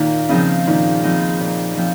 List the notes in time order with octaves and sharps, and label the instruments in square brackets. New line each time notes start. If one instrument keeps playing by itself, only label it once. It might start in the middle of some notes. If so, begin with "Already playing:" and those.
Already playing: [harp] A#2 [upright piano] D#3
[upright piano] C#3 [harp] F3 C4 D#4
[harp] A#2 [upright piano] D#3
[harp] F3 C4 D#4
A#2
F3 C4